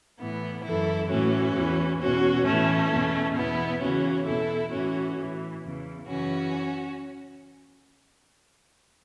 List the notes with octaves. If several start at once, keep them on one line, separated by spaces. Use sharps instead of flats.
A2 E3 B3
F#2 E3 E4 A4
A2 E3 C#4 F#4
E2 E3
E2 B2 C#4 F#4
A2 E3 A3 C#4
E2 B2
E2 B2 B3 E4
E2 C#3 E3 C#4 F#4
E2 B2 E4 A4
A2 E3 C#4 F#4
A2 E3
E2 C#3 E3
F#2 C#3 E3 C#4 F#4